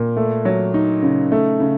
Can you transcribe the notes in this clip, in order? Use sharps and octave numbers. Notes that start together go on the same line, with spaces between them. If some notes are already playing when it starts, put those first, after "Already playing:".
Already playing: A#2
A3
F#3
D#4
C#3
A3
C#3